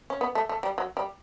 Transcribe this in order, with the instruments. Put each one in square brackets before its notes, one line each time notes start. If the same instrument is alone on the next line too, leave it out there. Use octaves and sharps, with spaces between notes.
[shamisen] C#4
B3
A3
A3
G3
F#3
G3